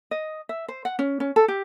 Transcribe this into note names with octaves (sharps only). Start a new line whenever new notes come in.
D#5
E5
C5
F#5
C#4
C#4
A4
G4